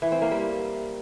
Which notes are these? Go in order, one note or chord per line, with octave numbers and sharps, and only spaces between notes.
E3
C4
A#3
G3